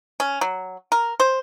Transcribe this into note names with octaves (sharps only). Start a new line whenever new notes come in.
C#4
F#3
A#4
C5